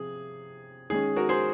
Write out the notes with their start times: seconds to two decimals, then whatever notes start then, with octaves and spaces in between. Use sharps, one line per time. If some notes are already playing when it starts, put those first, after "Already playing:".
Already playing: C3 F3 G#4
0.90 D#3 G#3 C#4 G#4
1.16 F#4 A#4
1.29 G#4 C5